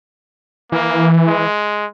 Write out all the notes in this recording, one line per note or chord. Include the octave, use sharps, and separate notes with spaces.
E3 A#3
G#3